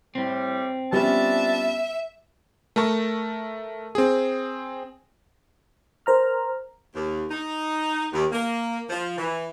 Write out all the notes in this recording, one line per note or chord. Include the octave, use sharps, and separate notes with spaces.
A2 G3 C4
G3 B3 C#4 D4 F4 E5 A5
A3 A#4 A5 C#6
C4 G#4
A#4 C5 A#5 F6
D#2
D#4
D#2
A#3
F3
E3